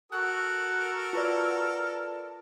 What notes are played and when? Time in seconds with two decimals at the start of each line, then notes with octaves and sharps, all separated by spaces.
0.12 F#4 A4 A#4 E6 F#6
1.13 F4 B4 D5 A5